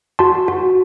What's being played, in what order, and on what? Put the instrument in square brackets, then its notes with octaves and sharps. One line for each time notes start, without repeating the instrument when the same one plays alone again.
[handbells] F#4 A5 C6
F#4